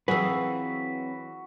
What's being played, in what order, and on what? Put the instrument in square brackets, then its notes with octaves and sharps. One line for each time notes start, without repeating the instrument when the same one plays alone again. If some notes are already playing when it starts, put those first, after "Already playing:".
[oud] E3 G#4 [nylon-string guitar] F#3 C4 F5 [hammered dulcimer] F#4 [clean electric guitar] B4